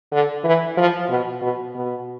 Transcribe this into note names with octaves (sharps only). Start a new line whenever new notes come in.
D3
E3
F3
B2
B2
B2